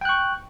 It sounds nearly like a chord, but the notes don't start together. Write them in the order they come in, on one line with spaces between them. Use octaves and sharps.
G5 F#6 C#6